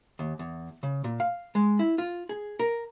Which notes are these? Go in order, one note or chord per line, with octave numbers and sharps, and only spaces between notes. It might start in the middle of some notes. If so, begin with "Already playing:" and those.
D#2
E2
C#3
A#2
F5
G#3
E4
F4
G#4
A#4